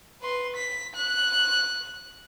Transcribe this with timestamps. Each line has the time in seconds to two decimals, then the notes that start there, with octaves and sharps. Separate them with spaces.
0.21 B4 C6
0.56 B6
0.95 F#6